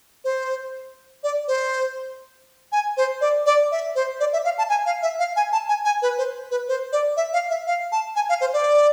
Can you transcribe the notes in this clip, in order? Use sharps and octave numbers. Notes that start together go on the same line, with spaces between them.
C5
D5
C5
G#5
C5
D5
D5
E5
C5
D5
E5
F5
A5
G#5
F5
E5
F5
G#5
A5
G#5
G#5
B4
C5
B4
C5
D5
E5
F5
E5
F5
A5
G#5
F5
C5
D5